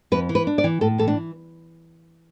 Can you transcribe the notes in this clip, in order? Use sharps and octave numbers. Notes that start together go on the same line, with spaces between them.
F2 B4
E3
B4
D4
D5
E3
A2 A4
E3 A4
D4